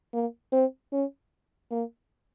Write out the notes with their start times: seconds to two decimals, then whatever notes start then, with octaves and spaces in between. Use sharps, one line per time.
0.14 A#3
0.53 C4
0.92 C#4
1.71 A#3